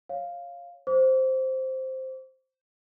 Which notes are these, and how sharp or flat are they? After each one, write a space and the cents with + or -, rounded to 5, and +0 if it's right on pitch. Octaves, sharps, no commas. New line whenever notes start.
C#5 -10 F5 +0
C5 +0 D6 -40